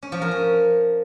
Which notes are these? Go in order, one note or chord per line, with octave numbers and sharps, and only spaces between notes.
C#4
F3
A#4
C#4